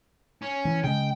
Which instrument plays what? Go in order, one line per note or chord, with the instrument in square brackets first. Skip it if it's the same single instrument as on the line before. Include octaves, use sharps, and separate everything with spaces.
[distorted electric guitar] C#4
[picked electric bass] E3
[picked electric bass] C#3 G#3 [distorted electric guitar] G5